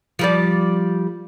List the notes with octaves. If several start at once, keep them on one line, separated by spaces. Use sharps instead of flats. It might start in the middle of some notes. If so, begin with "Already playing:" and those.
F3 G3 D5